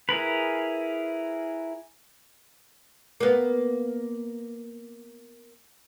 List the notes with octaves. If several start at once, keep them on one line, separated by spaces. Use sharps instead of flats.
E4 G#4 A#4 B4
A#3 B3